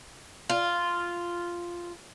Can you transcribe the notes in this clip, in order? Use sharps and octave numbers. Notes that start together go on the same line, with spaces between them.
F4